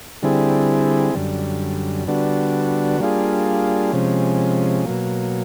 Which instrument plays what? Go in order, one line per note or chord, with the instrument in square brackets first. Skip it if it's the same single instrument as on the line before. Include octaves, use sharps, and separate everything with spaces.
[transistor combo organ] D3 G3 C4 E4 G#4
F#2 D3 G3
D3 G3 B3 D4 F#4
G3 A#3 D4 F4 G#4
C3 F3 G#3 C#4
B2 F#3 A#3